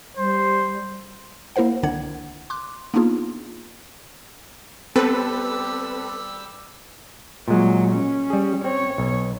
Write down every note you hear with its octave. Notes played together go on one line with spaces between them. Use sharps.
G3 C5
A#3 E4 A#4 C5 F#5
C2 D3 D#3 D4 F#5 G#6
C6 D6 F#6
A#3 B3 D4 D#4 F4 G#4
G3 B3 C4 G4 A4 B4 E6
A#2 F#3 G#3
C#4
G3 G#4
C4 C#5
B1